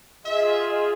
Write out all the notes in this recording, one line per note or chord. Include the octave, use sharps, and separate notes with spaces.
F4 G#4 D#5 E5